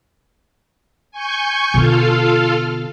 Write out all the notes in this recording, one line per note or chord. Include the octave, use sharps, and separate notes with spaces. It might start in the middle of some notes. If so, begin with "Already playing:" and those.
G#5 C#6 G6
B2 D3 F4 A4 F5